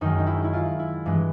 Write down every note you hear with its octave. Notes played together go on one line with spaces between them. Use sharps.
F#2 D#3 G#3 D#4
D#4
E4
E4
F4
E4
G2 E3 G#3